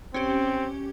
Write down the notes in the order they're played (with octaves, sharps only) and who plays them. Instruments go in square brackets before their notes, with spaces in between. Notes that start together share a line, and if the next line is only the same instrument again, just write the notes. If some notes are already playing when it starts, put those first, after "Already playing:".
[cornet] C4 [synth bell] C#4 G4